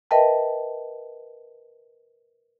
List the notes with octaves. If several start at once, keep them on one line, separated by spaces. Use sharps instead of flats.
A#4 B4 D#5 E5 G5 A5